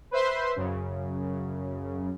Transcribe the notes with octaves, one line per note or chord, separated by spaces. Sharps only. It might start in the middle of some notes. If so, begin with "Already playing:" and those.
B4 C5 E5 C6
F#2 C#3